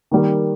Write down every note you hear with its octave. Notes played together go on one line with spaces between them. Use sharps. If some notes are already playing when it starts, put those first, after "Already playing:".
D#3 G3 A#3